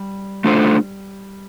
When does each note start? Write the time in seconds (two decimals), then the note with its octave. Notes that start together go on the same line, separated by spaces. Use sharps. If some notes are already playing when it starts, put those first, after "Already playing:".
Already playing: G3
0.44 A3 D4 F4 A4 C5